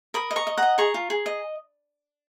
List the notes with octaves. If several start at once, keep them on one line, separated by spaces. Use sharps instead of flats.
A#4 B5 D#6
D#5
A#5 C#6
D#5
D#5 F#5 A#5
G#4 A#5 C#6
F4
G#4
D#5